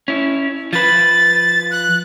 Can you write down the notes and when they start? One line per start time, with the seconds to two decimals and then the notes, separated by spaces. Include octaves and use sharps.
0.08 C#4 E4
0.73 F3 B4 A6
1.71 F#6